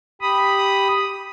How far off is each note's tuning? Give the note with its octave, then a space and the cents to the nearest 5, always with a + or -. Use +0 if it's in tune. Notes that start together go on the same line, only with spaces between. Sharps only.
G4 +0 B5 +0 D#6 +0